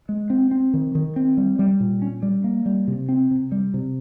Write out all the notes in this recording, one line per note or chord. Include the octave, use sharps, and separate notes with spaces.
G#3
C4
C4
D#3
D#3
C4
G3
G3
A#2
C#4
G3
A#3
G3
C3
C4
C3
G3
C3